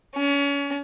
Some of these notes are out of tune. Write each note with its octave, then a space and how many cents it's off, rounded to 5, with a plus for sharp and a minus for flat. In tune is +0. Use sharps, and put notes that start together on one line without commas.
C#4 +30